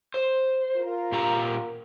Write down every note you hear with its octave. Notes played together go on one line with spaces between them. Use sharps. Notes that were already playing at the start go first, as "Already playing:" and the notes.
C5
F4 A#4
A#2 G4 A#5